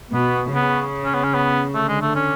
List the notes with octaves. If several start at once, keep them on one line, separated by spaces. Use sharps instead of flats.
B2 B3
C#3 B3
C#4
B3
C#4
B3
D3 A3
G#3
A3
C#4